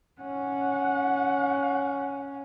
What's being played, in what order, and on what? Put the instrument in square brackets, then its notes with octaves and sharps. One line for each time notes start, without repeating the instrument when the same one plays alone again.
[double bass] C#4 [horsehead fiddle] F#5